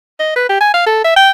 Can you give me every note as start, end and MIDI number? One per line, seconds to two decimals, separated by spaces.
0.20 0.34 75
0.36 0.47 71
0.49 0.61 67
0.61 0.69 80
0.74 0.84 77
0.86 1.04 69
1.05 1.16 76
1.16 1.31 79